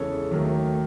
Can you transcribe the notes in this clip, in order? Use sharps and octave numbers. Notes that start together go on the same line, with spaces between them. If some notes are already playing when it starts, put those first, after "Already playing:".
Already playing: E2 C#3 E3 G#3 A4 C#5
D#2 D#3 F#3 A3